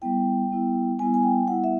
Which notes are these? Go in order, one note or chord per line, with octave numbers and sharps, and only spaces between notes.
G3 B3 E4 G5
G3 B3 E4
G3 B3 E4 G#5
G#5
G5
G3 B3 E4 F#5
E5